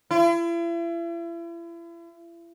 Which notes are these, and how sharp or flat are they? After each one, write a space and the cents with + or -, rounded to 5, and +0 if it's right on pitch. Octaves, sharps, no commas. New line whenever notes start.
E4 +40